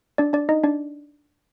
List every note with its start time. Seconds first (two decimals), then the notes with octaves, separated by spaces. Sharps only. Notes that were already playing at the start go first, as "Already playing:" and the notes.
0.18 D4 D5
0.33 D4 D5
0.49 D#4 D#5
0.63 D4 D5